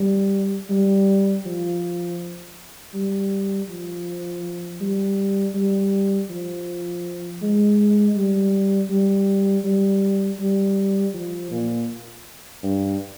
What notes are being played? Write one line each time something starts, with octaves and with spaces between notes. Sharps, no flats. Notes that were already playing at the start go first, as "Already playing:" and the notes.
Already playing: G3
G3
F3
G3
F3
G3
G3
F3
G#3
G3
G3
G3
G3
F3
A#2
G2